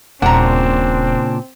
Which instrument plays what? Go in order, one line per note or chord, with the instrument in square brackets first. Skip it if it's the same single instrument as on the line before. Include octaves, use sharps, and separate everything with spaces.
[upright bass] D#1 [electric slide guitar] A#2 C#3 D4 [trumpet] C4 [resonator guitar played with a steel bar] F#5 A#5